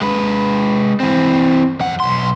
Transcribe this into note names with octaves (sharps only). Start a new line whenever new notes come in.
G#3 B4
E3 C4
F2 F#5
B1 C6